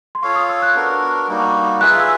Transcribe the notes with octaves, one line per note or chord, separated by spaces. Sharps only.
C6
F4 A4 C#5 F5 C#6
D#6
E6
F#6
B3 D4 F#4 A#4
G3 A#3 D#4 F#4
F4 G#4 B4 E5 F#6
E6